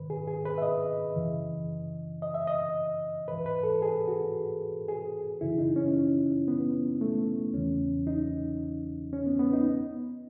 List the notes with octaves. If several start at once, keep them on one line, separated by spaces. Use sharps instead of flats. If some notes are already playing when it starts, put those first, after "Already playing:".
Already playing: G#2 D#3 B4
G#4
G#4
B4
E5
D#5
F#2 C#3 E3
D#5
E5
D#5
G#2 E3 B4
B4
A4
G#4
F#4
G#4
F#2 C#3 E3 E4
D#4
C#4
B3
A3
E2 C#3 E3 C#4
D#4
C#4
B3
B3
D#4